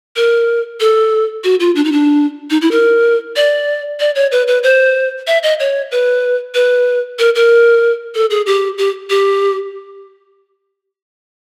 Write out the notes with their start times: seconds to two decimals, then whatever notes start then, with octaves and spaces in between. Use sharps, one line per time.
0.16 A#4
0.80 A4
1.44 F#4
1.60 F4
1.76 D4
1.85 D#4
1.92 D4
2.50 D#4
2.61 E4
2.71 A#4
3.36 D5
4.00 D5
4.15 C#5
4.32 B4
4.48 B4
4.63 C5
5.27 E5
5.43 D#5
5.60 C#5
5.91 B4
6.55 B4
7.19 A#4
7.35 A#4
8.15 A4
8.30 G#4
8.46 G4
8.78 G4
9.10 G4